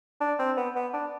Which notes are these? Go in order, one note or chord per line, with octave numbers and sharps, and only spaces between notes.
D4
C4
B3
B3
D4